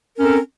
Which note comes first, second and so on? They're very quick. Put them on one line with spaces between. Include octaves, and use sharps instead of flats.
A#4 C#4 C4 A4